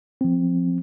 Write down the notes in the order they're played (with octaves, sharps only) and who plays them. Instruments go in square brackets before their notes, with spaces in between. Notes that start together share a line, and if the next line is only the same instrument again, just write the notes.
[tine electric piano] F3 C4